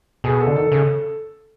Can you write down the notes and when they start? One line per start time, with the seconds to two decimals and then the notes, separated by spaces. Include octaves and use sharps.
0.24 B2 G#4
0.40 A4
0.47 D3
0.56 D#3 A4
0.72 C#3